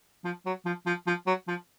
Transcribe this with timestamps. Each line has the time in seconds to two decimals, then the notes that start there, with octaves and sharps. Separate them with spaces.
0.24 F3
0.46 F#3
0.65 F3
0.86 F3
1.07 F3
1.26 F#3
1.48 F3